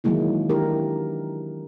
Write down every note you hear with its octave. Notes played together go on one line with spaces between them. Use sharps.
D#3 E3 F#3 G#3 A#3 E4
D4 E4 G4 A#4